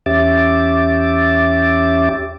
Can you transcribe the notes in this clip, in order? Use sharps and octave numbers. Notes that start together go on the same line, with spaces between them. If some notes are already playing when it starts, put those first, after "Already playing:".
E2 C#4 G4 E5 D6 A6